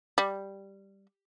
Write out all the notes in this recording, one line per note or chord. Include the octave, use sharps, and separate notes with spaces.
G3